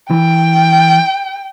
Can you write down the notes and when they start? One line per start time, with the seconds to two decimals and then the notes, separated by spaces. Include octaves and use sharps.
0.11 E3 G5